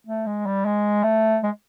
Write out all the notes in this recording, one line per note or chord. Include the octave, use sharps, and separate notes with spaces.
A3
G#3
G3
G#3
A3
G#3